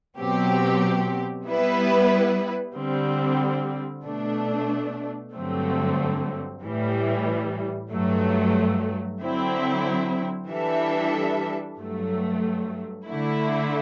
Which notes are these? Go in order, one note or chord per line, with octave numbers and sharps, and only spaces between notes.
B2 F#3 C4 G4
G3 B3 E4 B4
D3 G3 C4
B2 A3 D4
G2 D3 F#3 A3 C4
A2 E3 G3
G2 F#3 A3
D3 F#3 C4 E4
E3 G3 D4 A4 E5
G2 F#3 A3
D3 A3 E4